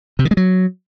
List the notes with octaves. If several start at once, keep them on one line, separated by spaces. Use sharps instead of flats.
C3
D#3
G#3
F#3